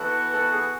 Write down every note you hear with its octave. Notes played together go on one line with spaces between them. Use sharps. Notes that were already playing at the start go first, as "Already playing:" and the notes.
Already playing: E3 B3 F#4 A4
A4
G#4